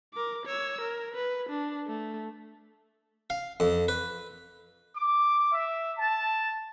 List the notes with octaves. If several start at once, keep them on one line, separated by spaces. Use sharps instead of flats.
A#4 D6
C#5 E6
A#4
B4
D4
A3
F5
F2
B4
D6
E5
A5